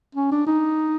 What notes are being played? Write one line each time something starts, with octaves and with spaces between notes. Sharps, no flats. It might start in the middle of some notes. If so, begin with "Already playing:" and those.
C#4
D4
D#4